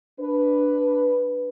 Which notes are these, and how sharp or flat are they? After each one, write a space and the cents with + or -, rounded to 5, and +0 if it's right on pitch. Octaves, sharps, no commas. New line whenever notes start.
D4 +0 B4 +0